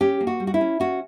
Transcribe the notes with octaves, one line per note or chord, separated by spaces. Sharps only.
C#4 G4
A#3
F#4
G3
F#4
E4
C#4
C#4 F#4